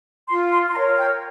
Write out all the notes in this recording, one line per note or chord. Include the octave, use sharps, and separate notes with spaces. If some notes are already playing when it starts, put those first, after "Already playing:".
F4 C6
C6
C6
A#4 C#5 A#5
G5